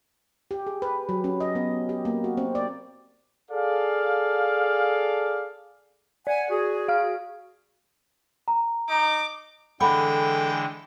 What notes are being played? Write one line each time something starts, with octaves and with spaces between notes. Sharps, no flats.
G4
G#4
B4
F#3
C#4
D#5
B3
G4
A#3
F#4
C4
D5
G#4 A4 D5 F5
D5 F#5 G#5
F#4 G#4
F5 F6
A#5
D#4 D6
D3 E3 G#3 A4 F#5 G5 B5 D6